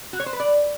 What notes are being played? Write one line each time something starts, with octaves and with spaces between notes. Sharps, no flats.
F#4
C#5
C5
B4
D5